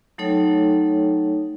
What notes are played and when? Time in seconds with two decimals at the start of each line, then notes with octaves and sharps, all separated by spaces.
0.18 F#3 A3 D#4 A4 C#5 G5